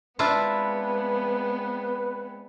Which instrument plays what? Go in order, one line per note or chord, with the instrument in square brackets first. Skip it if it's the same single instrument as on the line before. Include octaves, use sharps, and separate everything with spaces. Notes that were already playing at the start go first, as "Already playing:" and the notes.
[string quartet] G#3 B3 C4 [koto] D4 E4 F4 [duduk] B4